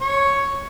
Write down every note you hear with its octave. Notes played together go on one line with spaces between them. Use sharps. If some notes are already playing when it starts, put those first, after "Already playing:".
C#5